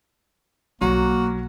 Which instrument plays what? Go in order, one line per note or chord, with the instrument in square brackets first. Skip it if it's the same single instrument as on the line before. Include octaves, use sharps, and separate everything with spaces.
[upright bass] B1 [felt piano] F#3 [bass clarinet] A#3 [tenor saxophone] F#4